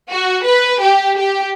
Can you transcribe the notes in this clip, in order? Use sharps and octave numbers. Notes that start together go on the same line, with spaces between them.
F#4
B4
G4
G4